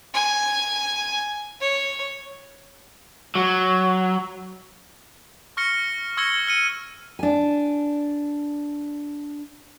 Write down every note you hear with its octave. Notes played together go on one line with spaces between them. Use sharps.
G#5
C#5
F#3
C#6 F6 A#6 C#7 G7
C#6 E6 G#6 A#6 C#7 G7
F6 C#7 D#7
D4 G#5